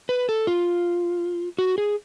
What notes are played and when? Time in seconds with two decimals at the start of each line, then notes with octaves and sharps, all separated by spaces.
0.09 B4
0.29 A4
0.47 F4
1.59 F#4
1.78 G#4